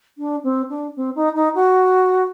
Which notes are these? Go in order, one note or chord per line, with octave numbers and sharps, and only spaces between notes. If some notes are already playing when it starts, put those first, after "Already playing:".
D4
C4
D4
C4
D#4
D#4
F#4